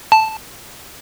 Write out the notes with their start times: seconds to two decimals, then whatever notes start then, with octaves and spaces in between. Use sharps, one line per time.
0.12 A5